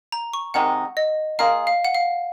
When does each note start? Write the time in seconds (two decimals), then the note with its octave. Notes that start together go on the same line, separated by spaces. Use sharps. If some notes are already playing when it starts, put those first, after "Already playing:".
0.12 A#5
0.34 C#6
0.54 C3 D#3 G#3 D#4 F#5
0.97 D#5
1.39 A#3 F4 G#4 F5
1.67 F5
1.85 F#5
1.95 F5